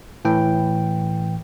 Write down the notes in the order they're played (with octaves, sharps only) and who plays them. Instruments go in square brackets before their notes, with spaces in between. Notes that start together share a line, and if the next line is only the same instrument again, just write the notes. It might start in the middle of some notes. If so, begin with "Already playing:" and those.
[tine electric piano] A2 E3 G5